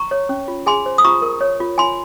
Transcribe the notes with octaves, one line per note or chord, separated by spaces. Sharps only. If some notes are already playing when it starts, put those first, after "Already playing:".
Already playing: A#5 C#6
C#5
C#4
F4
G#4 G#5 C6
C5
D#6
F4 A#5 C#6
A#4
C#5
F4
F4 G#5 C6